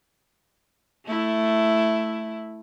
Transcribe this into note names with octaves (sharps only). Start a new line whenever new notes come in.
A3 E4